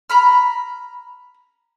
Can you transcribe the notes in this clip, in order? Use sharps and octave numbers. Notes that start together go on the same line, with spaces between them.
A#5 B5 F6